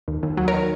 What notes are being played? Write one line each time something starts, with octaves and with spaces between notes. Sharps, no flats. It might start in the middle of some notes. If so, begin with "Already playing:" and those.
D#2
D#2
F#3
A#4 C#5
D#3